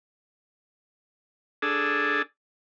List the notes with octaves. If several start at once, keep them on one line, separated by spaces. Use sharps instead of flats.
D4 G#4 A4